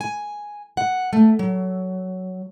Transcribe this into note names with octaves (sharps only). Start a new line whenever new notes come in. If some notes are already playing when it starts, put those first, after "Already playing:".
G#5
F#5
A3
F#3